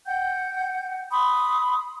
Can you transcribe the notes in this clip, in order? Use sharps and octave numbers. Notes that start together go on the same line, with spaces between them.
F#5 G5 G6
B5 C6 D#6